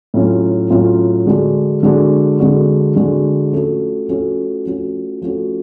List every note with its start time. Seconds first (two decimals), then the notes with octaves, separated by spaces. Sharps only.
0.14 A2 F#3 C#4 F4
0.70 A2 F#3 C#4 F4
1.26 D3 G#3 D4 F#4
1.83 D3 G#3 D4 F#4
2.40 D3 G#3 D4 F#4
2.96 D3 G#3 D4 F#4
3.52 F3 A3 C#4 F#4
4.08 F3 A3 C#4 F#4
4.66 F3 A3 C#4 F#4
5.22 F3 A3 C#4 F#4